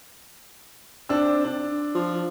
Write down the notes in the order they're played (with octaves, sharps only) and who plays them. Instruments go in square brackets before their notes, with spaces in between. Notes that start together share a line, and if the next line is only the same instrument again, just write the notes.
[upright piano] C4 D4 E6
D4
[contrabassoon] F3